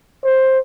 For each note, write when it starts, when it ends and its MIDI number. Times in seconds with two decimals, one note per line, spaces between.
0.24 0.59 72